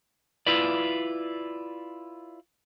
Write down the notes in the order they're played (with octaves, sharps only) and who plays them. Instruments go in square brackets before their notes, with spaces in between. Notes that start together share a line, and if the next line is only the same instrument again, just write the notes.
[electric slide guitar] E4 F4 B4 D5